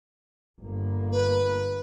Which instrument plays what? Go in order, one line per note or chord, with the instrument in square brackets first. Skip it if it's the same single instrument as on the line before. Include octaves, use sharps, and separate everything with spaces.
[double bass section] G1 A#3
[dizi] B4